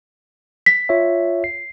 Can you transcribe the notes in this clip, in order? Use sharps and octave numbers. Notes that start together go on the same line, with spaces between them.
B6
F4 C#5 E5
C7